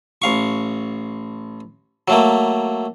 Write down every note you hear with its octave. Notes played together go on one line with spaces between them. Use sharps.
A1 F5 C#6
F#3 A3 A#3